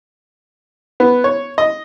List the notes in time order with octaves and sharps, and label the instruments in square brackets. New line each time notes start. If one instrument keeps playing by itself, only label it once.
[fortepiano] B3
C#5
D#5